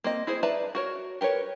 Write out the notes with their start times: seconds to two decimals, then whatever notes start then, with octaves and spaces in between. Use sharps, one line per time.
0.04 A#3 C4 D#5
0.27 E4 G#4 C5
0.43 B4 D5 E5 A5 A#5
0.75 F#4 A#4 C#5
1.21 G4 A#4 B4 C#5